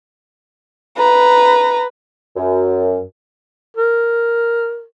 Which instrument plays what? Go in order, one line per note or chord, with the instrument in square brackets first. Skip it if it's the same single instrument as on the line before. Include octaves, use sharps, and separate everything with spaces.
[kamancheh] B4 A#5
[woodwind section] F#2
[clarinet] A#4